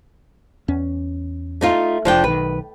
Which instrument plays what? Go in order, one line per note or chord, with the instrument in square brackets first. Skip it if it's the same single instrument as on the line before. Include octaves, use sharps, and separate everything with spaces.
[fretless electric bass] E2 C#4
[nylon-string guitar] A3 D#4 F4
[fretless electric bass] F1 [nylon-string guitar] F3 D4 G5
[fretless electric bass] B1 D#3 [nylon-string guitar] B4